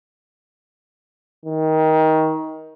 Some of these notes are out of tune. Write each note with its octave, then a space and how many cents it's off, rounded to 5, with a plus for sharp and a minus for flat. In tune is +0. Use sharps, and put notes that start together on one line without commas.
D#3 +20